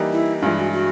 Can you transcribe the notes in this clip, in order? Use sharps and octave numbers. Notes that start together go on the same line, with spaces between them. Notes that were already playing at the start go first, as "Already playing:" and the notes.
Already playing: E3 G3 A#3 D#4 G4
E4
G2 E3 G#3 F4
F#4
F#4